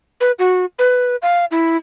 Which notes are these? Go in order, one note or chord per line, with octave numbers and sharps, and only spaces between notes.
B4
F#4
B4
F5
E4